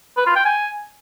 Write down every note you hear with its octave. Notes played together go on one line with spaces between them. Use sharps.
B4
F4
G5
G#5